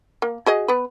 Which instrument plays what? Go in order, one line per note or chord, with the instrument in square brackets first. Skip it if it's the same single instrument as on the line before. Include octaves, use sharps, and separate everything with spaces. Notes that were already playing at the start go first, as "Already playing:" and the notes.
[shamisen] A#3
F#4 G#4 D#5
B3 B4